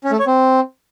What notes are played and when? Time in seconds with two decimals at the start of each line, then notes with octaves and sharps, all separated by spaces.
0.04 C#4
0.12 A3
0.19 C#5
0.27 C4